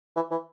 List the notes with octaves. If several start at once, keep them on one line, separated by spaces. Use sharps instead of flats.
E3
E3